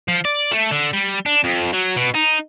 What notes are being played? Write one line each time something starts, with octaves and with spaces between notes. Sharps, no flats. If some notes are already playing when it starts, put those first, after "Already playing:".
F3
D5
A3
D3
G3
D4
F2
F#3
B2
D#4